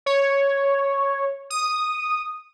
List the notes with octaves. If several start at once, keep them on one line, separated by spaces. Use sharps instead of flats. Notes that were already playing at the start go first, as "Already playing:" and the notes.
C#5
D#6